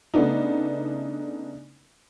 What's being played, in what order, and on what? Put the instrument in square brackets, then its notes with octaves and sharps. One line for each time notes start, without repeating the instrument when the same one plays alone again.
[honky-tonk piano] C#3 A3 B3 D4 D#4